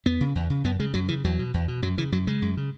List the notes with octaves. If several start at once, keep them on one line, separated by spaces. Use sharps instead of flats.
E2 B3
C#3
E2
C#3
F#2 B3
C#3 G#3
F#2 F#3
C#3 E3
E2 F#3
B2
E2
B2
F#2 F#3
C#3 E3
F#2 F#3
C#3 G#3
F#2
C#3